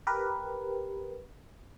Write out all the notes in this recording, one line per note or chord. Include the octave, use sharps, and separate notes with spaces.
G4 A#4 B4